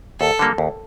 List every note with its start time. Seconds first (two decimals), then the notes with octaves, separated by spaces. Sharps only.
0.20 D#2 A4
0.39 D3 G3 A#3
0.58 D#2